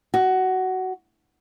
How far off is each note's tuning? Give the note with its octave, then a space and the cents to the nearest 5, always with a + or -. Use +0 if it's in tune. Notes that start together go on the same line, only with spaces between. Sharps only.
F#4 +15